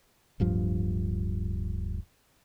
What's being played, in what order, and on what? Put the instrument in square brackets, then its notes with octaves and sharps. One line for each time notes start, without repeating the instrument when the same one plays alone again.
[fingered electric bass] D1 G2 F3